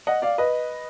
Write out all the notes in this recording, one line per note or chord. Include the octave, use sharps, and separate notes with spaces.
D#5 F#5
D5 F5
B4 D#5